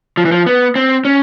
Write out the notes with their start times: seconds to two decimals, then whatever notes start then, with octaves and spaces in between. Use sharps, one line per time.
0.17 F3
0.25 E3
0.32 F3
0.46 B3
0.75 C4
1.05 C#4